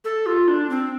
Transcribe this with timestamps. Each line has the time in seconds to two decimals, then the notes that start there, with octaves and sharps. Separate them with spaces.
0.04 A4
0.26 F4
0.48 D4
0.70 C4